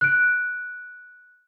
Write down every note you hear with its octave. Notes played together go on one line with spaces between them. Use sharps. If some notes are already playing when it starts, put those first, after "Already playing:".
F#6 D7